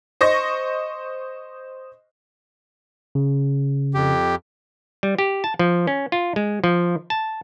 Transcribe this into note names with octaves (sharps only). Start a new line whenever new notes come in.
C5 D#5 C#6 A#6
C#3
F2 G4
G3
G4
A5
F3
C#4
F4
G#3
F3
A5